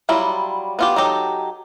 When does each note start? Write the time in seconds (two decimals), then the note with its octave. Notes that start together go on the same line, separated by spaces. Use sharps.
0.09 F#3 G3 E4 F4
0.79 B3 F4 G4
0.96 F#3 D#4 G4 A4